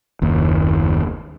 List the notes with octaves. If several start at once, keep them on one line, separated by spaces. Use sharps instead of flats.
F#1 D#2